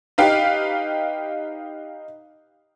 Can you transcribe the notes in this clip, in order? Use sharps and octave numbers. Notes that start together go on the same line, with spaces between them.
D#4 G4 B4 F5 G5